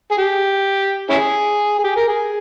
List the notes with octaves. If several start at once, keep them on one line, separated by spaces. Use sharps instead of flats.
G#4
G4
C#4 E4 G#4
G#4
G4
A#4
G#4